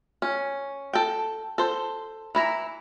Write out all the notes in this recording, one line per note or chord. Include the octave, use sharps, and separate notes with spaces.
C#4
A4 G5
A4 C5
E3 E4 A#5